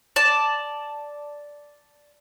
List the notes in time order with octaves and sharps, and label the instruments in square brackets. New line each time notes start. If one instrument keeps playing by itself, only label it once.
[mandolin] D5 A5